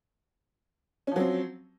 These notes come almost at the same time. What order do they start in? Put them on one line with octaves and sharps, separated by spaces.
C#4 F3 F#3 C4